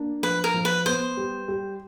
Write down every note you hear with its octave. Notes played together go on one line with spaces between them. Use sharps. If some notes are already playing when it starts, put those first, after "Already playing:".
Already playing: A#3 D4
F3 B4
A#4
F3
B4
B3 C5
G3
G3